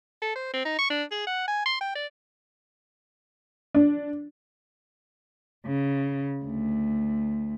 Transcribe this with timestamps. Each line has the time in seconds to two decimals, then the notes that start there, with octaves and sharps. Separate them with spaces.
0.22 A4
0.36 C5
0.54 C4
0.65 D#4
0.79 C#6
0.90 D4
1.12 G#4
1.27 F#5
1.48 G#5
1.66 C6
1.81 G5
1.95 D5
3.75 D4
5.66 C#3
6.43 D2